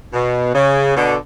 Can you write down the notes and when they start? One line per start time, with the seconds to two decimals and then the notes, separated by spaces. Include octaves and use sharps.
0.13 B2
0.54 C#3
0.97 B2 D3